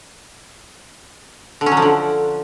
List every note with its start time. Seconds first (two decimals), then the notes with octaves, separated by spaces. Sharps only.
1.61 D3
1.66 C#4
1.72 F#3
1.77 F3
1.82 D3